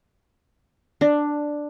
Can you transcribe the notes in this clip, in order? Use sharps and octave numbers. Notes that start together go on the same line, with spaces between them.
D4